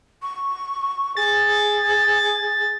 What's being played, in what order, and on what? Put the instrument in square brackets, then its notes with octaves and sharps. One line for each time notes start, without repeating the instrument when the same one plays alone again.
[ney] C#6
[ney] G#4 [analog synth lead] A6